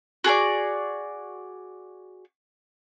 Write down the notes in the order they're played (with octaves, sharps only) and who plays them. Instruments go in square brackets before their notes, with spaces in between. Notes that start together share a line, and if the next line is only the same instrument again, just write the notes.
[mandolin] F#4 G#4 A4 D5